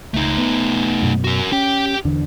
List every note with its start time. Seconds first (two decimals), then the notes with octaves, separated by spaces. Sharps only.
0.14 C#2 A3 D#4
0.38 B3
1.02 F#2 B2
1.24 F#4 A#4
1.52 C#4 G4 G5
2.05 E2 D3 D4